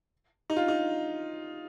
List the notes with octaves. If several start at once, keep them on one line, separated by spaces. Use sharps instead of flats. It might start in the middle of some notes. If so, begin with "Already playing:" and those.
D#4
F4
D#4